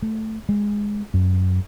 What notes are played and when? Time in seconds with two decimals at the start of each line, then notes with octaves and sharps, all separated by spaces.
0.02 A3
0.49 G#3
1.14 F#2